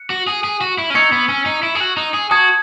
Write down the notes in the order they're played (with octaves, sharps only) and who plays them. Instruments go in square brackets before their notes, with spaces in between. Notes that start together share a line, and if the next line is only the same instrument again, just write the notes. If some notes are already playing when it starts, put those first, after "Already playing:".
Already playing: [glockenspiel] F#6 C#7
[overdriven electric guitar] F#4
G#4
G#4
F#4
E4
C#4
[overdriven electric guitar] D#4 [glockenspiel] C#6 E6 G#6 C#7
[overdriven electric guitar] B3
C#4
D#4
E4
G#4
F#4
D#4
G#4
[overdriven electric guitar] F#4 [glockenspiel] A5 D#6 G#6